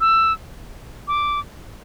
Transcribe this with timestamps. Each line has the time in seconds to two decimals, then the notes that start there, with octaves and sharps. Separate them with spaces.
0.01 E6
1.08 D6